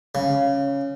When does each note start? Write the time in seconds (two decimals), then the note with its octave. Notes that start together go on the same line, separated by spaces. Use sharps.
0.15 C#3